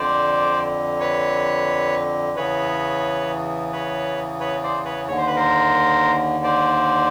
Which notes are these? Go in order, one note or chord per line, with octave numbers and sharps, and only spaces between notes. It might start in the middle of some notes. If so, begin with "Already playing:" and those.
Already playing: F2 D3 C5 D5
B4 C#5
E2 C#3 E3 B4 C#5
B4 C#5
B4 C#5
C5 D5
B4 C#5
D#2 D3 C#5
C5
B4
A#4 C5
C5 D5